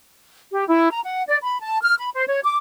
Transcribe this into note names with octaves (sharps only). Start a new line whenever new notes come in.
G4
E4
A#5
F#5
D5
B5
A5
F6
B5
C5
C#5
D6